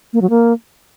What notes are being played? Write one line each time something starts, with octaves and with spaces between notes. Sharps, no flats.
A#3
F#3
A#3